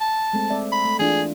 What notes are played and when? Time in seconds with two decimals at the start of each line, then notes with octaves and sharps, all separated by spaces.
0.01 A5
0.33 G#3 A3 C4
0.50 C4 D5 E5
0.72 B5
0.85 A3
0.99 E3 D4 F4 G#4